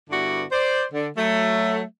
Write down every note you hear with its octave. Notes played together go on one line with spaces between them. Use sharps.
G2 D3 B3 E4 F#4 D5
C5 D5
D3
F#3 A3